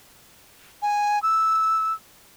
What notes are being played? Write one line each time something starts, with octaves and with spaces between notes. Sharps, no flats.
G#5
E6